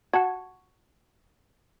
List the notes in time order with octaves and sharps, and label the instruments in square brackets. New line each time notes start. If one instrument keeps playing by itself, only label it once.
[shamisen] F#4 [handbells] F#5 A5 G#6